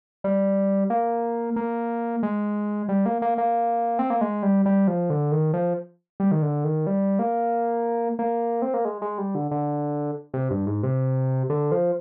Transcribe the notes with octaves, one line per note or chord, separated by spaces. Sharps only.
G3
A#3
A#3
G#3
G3
A#3
A#3
A#3
C4
A#3
G#3
G3
G3
F3
D3
D#3
F3
G3
D#3
D3
D#3
G3
A#3
A#3
C4
A#3
G#3
G#3
G3
D3
D3
C3
G2
G#2
C3
D3
F3